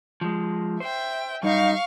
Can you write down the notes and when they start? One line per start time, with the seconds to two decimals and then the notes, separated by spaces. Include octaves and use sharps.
0.21 F3 G#3
0.80 C5 E5 G5
1.43 F#2 G3 D#4 F5 C#6